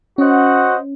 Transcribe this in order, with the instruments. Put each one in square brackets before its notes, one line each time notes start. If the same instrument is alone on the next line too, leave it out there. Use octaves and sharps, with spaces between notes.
[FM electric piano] C#4 [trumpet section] F#4 C5 D#5 F#5